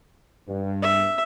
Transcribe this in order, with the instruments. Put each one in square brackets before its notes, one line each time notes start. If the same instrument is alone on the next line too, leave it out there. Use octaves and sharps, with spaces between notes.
[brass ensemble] G2
[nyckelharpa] E5